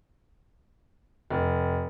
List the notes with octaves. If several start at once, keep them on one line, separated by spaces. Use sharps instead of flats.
F1